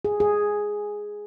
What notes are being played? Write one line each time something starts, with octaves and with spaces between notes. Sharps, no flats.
G#4
G#4